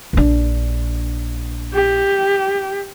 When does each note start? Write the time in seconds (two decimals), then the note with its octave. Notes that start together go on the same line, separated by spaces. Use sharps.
0.13 A#1 D4
1.74 G4